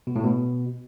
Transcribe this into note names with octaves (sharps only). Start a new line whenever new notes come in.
B2
A2
B2